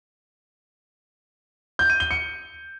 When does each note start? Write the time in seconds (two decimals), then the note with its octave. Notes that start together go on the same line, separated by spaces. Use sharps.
1.79 G6
1.90 D#7
2.00 G7
2.11 C#7